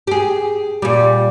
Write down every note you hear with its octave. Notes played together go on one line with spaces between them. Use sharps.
G4 G#4
A#2 G3